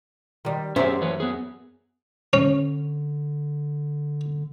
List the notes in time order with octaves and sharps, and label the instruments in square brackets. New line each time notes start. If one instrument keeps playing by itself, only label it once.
[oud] D#3 G3
[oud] F#2 C5 E5 [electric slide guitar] C#4 G4 G#4
[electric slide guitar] E3 B4 C#5
B3 G#4
[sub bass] D3 [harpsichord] C#4